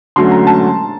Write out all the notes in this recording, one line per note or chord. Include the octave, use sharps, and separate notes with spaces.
D3 F#3 A3 C#4 C6
A#5
A5